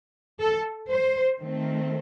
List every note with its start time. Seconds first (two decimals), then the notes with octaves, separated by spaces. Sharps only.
0.40 A4
0.91 C5
1.41 D#3 A3 C4